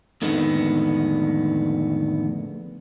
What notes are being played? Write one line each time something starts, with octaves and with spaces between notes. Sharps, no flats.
F2 A2 D3 D#3 G#3 B3